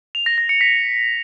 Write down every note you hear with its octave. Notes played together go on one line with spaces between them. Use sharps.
F7
A#6
A#6
C#7
B6